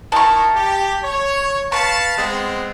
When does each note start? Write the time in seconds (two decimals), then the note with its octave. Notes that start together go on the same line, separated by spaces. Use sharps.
0.12 D#4 E4 A#4 A5 C#6
0.55 G4
1.03 C#5
1.72 B4 F5 A5 C#6
2.17 G#3 B3 C4